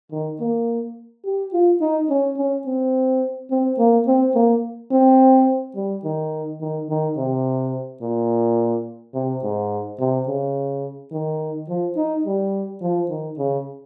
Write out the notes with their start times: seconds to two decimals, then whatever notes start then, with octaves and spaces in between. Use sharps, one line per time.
0.11 D#3
0.40 A#3
1.25 G4
1.53 F4
1.81 D#4
2.09 C#4
2.37 C#4
2.66 C4
3.51 C4
3.78 A#3
4.07 C4
4.34 A#3
4.91 C4
5.76 G3
6.04 D#3
6.61 D#3
6.89 D#3
7.17 C3
8.02 A#2
9.14 C3
9.43 G#2
9.99 C3
10.27 C#3
11.12 D#3
11.69 F3
11.96 D#4
12.25 G3
12.81 F3
13.09 D#3
13.38 C#3